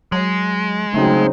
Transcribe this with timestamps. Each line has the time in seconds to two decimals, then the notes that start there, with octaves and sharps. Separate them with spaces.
0.12 F#3 G#3
0.94 C#3 F#3 A3 C4 D#4